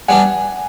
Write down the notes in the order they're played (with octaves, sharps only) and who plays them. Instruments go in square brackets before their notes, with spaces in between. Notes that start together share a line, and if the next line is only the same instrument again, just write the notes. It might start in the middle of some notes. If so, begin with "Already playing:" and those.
[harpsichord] G3 B3 D4 [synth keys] F#5 G#5